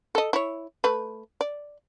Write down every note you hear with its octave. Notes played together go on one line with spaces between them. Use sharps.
A4 D#5
E4 C#5
A3 B4
D5